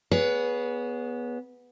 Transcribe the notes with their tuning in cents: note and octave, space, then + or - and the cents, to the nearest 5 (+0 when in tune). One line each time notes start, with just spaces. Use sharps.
B3 -15 G#4 +0 C#5 +20